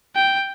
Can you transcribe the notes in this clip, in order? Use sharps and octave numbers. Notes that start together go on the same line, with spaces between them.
G5